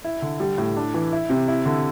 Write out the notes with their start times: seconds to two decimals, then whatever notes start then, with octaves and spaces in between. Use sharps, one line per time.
0.04 E4
0.22 D3
0.40 G3
0.58 A2
0.77 D4
0.94 E3
1.13 E4
1.30 C3
1.48 E4
1.66 D3